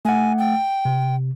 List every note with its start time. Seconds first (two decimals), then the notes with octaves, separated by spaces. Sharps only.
0.05 A3 F#5 G#5
0.38 G5
0.85 C3